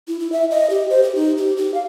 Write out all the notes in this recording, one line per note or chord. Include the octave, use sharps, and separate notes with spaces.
E4
E4
E5
D#5
G4
C5
G4
D#4
G4
G4
F5